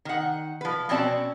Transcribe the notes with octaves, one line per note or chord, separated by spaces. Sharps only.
D#3 F#5
F3 B4
B2 C4 C#4 D5 A5